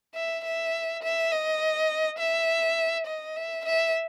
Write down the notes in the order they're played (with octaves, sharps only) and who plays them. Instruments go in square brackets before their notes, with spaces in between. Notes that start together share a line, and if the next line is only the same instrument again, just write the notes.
[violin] E5
E5
E5
D#5
E5
D#5
E5
E5